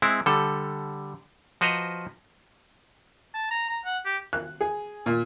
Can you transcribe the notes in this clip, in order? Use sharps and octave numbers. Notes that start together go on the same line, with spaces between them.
G#3 C4 E4
D3 G3 A4
F3 F#4 B4 C5 D#5 A#5
A5
A#5
A#5
F#5
G4
F#6
G#4
A#2